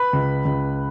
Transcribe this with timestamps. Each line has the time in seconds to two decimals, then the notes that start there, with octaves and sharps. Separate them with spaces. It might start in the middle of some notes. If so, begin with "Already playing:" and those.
Already playing: B4 B5
0.13 C#2
0.45 C#2